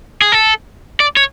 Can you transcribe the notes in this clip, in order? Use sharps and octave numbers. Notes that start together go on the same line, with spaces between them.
G#4
A4
D5
C#5